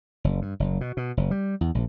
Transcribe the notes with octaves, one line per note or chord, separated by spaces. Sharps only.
F#1
G2
F#1
B2
B2
F#1
G3
E2
A#1